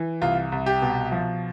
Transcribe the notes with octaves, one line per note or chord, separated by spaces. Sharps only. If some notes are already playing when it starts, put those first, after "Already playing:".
Already playing: E3
C2 F4
C2
G4
B2
F3